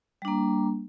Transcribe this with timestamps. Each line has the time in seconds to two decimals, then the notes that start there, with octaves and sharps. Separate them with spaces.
0.22 G3
0.25 D4
0.28 A#3